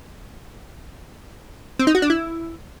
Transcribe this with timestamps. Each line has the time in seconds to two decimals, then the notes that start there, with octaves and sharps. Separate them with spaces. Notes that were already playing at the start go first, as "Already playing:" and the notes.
1.79 C4
1.87 D#4
1.95 F#4
2.02 D4
2.10 E4